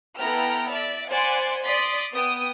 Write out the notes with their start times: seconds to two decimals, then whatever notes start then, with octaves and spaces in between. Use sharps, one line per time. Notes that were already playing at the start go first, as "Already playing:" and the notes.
0.18 B3 E4 A4 G5 A#5 F6
0.70 D5 E5
1.09 C5 D5 F#5 G#5 B5 C6
1.65 D5 C6 D#6 A6 B6 C7
2.14 B3 G5 D#6